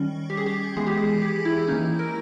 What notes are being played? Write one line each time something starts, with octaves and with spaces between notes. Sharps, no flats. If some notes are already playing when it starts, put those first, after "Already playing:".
Already playing: D#3 G3 C#4
G4
G#4
G4
E3 G#3 B3 G#4
G4
G#4
G4
E4
E3 A#3 C#4 D#4
E4
A#4